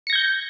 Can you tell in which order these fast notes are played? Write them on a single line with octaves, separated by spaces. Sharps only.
C#7 A#6 G#6 G6